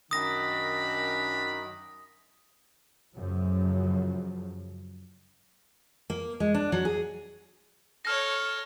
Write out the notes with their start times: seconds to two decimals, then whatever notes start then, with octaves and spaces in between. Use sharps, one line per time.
0.11 F#2 D#3 D4 A#5 B5 D#6 A#6
3.15 F#2 A2 C#3 F3 F#3
6.10 A#3
6.40 G#3
6.54 D4
6.72 F#3
6.85 G#4
8.05 A4 C#5 F6 A#6